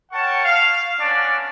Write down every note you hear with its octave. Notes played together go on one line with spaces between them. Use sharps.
A#4 C#5 F#5 G5 A5 C#6
F5
B3 C#4 D4 C#5 D5